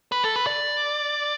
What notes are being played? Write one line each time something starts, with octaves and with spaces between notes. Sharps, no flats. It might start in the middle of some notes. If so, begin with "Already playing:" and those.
B4
A4
B4
D5